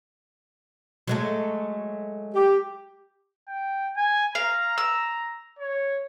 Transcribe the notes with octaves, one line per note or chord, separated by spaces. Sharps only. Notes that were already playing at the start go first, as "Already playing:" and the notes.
F#3 G#3 A3
G4
G5
G#5
F5 A#5
E6
C#5